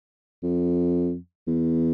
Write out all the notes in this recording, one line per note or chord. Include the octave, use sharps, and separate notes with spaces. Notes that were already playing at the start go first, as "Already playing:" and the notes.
F2
E2